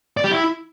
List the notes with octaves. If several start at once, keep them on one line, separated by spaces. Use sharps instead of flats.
D5
G4
E4